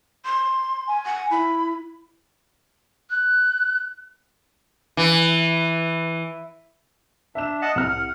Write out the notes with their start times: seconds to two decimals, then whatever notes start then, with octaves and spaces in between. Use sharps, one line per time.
0.25 C6
0.88 G#5
1.06 F#5
1.31 E4 B5
3.10 F#6
4.97 E3
7.35 D4 E5 E7
7.62 D#5 F#5 A5
7.76 C2 F#5 F6